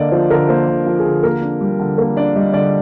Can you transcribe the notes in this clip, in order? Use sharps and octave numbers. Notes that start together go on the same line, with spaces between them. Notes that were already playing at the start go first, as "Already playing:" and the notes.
Already playing: D3 A#3 D5 D#5
F3 C5
D3 A#4
A#3 C5
D3
F3
G#4
D3
A#3 A#4
D4
G3
D3
A#3 A#4
D4 D5
G3 D#5
D3 D5